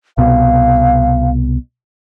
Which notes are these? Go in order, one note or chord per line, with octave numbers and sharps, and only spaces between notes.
C2 B2 F5